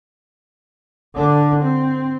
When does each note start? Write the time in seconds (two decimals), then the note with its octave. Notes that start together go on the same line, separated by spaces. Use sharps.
1.15 D3 D4
1.62 C4